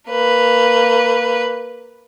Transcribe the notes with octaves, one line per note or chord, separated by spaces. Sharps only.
A#3 B4